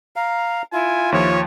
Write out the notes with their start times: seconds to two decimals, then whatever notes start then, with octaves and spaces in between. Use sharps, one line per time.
0.16 F5 A#5
0.73 E4 F4 G#5
1.12 D#2 F3 C#5